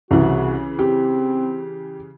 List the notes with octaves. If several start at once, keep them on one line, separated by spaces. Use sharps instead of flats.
C2 C#3 E3 F#4
C4 G4